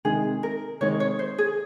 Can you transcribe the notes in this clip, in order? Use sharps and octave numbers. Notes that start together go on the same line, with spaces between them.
C3 D#3 G#3 D#4 G#4
A#4
C3 D#3 G#3 D#4 C#5
C#5
C5
G#4